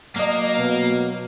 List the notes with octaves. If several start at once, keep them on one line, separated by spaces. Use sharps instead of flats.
F#3 A#3 D#5
B2